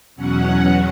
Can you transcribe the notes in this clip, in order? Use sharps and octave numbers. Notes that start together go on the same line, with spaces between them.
E2 B2 F#3 C#4 F#5